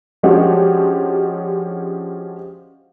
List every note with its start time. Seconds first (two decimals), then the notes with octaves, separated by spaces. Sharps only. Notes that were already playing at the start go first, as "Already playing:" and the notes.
0.23 F3 G#3 C#4 D4 F#4 G4